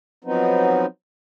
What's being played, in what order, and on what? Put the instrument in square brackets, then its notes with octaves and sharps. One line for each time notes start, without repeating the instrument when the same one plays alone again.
[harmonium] F3 F#3 B3 C4 D#4